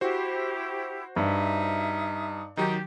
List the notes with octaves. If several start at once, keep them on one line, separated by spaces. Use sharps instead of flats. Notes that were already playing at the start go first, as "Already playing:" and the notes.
E4 F#4 G4 C5
G2 D#4 E5
D#3 F#3 D#4 G4